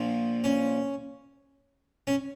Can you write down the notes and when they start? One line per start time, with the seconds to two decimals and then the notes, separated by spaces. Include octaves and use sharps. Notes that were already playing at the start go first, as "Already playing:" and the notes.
Already playing: A#1 A#2 F3
0.44 C#4
2.07 C#4